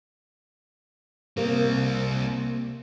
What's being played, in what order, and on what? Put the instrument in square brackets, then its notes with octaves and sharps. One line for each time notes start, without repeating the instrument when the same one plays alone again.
[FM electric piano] C3 A#3 [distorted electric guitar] G3 C4